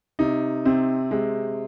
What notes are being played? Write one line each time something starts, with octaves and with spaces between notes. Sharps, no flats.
C3 D#4
C3 C4
C3 G#3